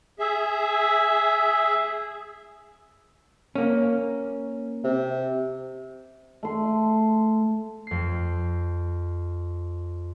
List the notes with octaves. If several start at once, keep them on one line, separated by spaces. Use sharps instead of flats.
G#4 E5
A#3 C#4
C3
A3 C6
F2 C7